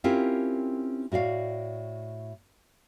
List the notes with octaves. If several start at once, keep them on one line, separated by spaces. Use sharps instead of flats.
C4 C#4 E4 F4 G4 A#4
A2 F#4 D5 F5